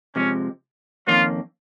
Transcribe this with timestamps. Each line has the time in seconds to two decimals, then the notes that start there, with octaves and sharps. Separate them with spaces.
0.16 C3 F3 G#3 C#4
1.07 F2 D#3 A#3 C#4 F4